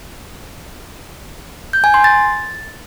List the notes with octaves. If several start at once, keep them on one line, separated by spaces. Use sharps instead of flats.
G6
G#5
C6
A6